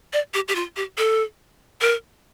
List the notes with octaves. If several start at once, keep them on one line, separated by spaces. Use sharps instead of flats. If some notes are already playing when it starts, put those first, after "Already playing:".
D5
G4
G4
F4
G4
A4
A#4